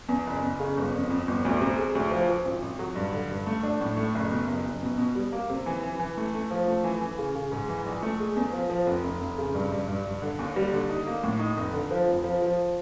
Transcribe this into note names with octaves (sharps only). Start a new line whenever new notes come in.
E2
F#1
E2
C#3
G1
F2
F2
G1
D2
C3
G#3
D2
F3
F3
G#1
G#1
F#3
G2
D3
G2
A3
D4
A2
A3
F#1
B2
F#1
F#1
B2
B2
G3
A#3
C3
E3
E3
E3
A3
A3
F3
A3
E3
E3
C#3
C#3
G#2
E3
A#1
A3
G#3
E2
F3
F3
F1
F1
F1
C#3
G2
G2
G2
G2
D3
D#2
G3
D3
D#4
A#3
A2
D#4
F1
D3
F3
F1
F3
F3